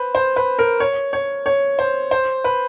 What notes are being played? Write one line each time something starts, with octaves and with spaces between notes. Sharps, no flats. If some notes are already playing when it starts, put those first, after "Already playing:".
Already playing: B4 C5
C5
B4
A#4
C#5
C#5
C#5
C5
C5
B4